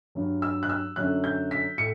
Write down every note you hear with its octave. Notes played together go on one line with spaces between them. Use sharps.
G2 F#3
E6
F#6
E6
F#2 D3 F#3 F#6
G6
B6
A2 C#7